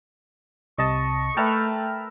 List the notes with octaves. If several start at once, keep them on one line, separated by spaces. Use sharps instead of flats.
C2 C3 D#5 A5 C#6
A3 A#4 B4 E5 G5 A5 F6